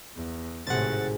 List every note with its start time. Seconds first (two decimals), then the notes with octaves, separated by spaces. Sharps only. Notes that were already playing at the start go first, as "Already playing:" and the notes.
0.16 E2
0.67 G#1 A2 C3 G#3 F#5 A6